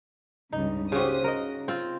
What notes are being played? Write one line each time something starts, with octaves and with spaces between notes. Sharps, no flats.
C#2 G2 C#3 D#4
C#3 F#4 G4 C5 D#6
C#3 A#4 D#5
C4 F4